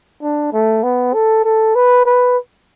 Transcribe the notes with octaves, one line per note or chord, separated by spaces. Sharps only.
D4
A3
B3
A4
A4
B4
B4